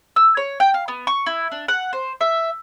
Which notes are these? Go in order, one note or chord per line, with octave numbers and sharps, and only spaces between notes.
E6
C#5
G5
F5
B3
C#6
E4
D4
F#5
C5
E5